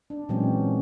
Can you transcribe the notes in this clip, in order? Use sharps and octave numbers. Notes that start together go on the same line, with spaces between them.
D4
A#2 E3 F#3 G#3 C4 C#4